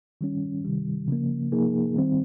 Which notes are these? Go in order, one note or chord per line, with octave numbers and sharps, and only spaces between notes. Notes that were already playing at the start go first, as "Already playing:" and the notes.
D#3 G3 C#4
C3 D#3 G3
C#3 F3 A#3
C3 F3 A#3 D#4 G#4
D#3 G3 C4